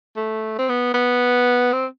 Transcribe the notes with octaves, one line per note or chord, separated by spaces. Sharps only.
A3
C4
B3
B3
C4